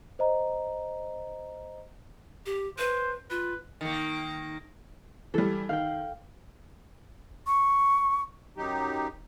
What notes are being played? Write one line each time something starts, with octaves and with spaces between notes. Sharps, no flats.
C5 D#5 A#5
G4
B4 C5
F4 B4
D#3 A#3
E3 G3 A4
D#3 F5 G5
C#6
F#2 F#3 D#4 G4